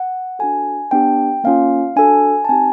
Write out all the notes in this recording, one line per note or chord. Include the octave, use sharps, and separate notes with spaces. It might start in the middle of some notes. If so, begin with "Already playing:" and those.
Already playing: F#5
D4 F#4 A4 G#5
B3 D4 G4 G5
A#3 C#4 F4 F5
D4 F#4 A4 G#5
A5
C4 D#4 G4 G#5